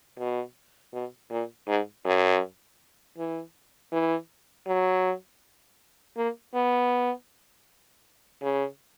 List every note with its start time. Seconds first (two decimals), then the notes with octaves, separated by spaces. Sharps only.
0.18 B2
0.93 B2
1.31 A#2
1.68 G#2
2.05 F#2
3.18 E3
3.92 E3
4.67 F#3
6.17 A#3
6.55 B3
8.42 C#3